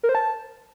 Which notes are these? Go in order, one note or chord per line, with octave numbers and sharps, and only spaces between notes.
A#4
C5
A5